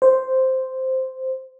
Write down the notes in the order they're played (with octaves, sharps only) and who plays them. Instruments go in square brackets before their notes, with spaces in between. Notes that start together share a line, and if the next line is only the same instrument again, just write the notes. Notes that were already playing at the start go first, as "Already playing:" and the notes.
[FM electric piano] C5